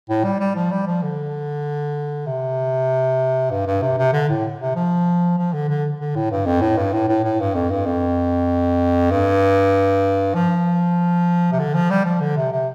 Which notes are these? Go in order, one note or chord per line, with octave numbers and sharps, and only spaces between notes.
A2
G3
G3
F3
G3
F3
D3
C3
G2
G2
C3
C3
D3
A2
C3
F3
F3
D3
D3
D3
A2
G2
F2
A2
G2
A2
A2
A2
G2
F2
G2
F2
G2
F3
C3
D3
F3
G3
F3
D3
C3
C3